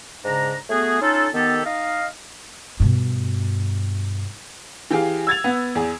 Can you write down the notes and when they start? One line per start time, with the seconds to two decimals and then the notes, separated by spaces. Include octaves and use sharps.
0.24 G#2 C#3 D4 A#5
0.70 A3 B3 F#4 G#4
1.01 C#4 D#4 F4 A4
1.34 D#3 B3 G4 A4
1.65 D#4 D#5 F5
2.80 G2 B2
4.91 E3 G4 G#4 F5
5.27 E6 G#6 A6 F7
5.44 B3
5.75 E2 G#4